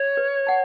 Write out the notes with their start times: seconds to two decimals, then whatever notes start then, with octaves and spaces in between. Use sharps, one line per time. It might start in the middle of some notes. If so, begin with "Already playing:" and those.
Already playing: C#5
0.17 B4
0.47 F#5 A5